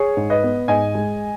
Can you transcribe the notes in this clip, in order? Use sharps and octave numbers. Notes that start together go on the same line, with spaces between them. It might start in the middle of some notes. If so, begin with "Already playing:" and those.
Already playing: G#4 C#5
G#2
B4 D#5
B3
G#2 D#5 G#5
G#3